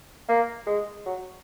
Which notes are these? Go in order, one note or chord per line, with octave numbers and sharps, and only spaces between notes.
A#3
G#3
F#3